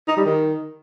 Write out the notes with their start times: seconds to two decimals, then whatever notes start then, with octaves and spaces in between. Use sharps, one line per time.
0.08 D#4
0.17 G3
0.26 D#3